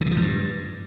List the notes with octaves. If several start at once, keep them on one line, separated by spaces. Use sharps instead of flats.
D3
B2
F3
G#2
G2